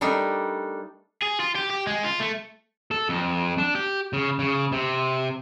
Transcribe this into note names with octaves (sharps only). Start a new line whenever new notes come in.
G3 A3 D4 D#4 A#4
G#4
F4
G4
G4
G#3
F4
A3
A4
F2
D4
G4
C#3
C#3
C3